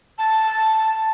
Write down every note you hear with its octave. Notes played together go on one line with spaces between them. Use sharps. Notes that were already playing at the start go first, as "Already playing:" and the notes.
A5